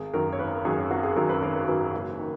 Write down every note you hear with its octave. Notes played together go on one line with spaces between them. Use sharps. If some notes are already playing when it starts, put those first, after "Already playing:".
Already playing: G#1 G#4
F#2 D#3 F#3 A#4
C#5
G#1 B4
F#2 D#3 F#3 G#4
G#1 F#4
G#4
F#2 D#3 F#3 A#4
B4
G#1 A#4
F#2 D#3 F#3 B4
F#1
D#3